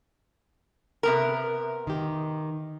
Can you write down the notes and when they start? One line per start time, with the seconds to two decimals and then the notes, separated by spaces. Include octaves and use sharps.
1.03 C3 B3 A#4
1.87 D#3 G4